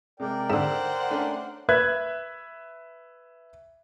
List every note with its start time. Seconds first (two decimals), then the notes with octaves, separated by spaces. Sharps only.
0.20 C3 G#3 A#4 D5 G5
0.50 G#2 D3 C5 F#5 E7
1.10 A3 C#4 D4
1.69 B4 E5 F#6 G#6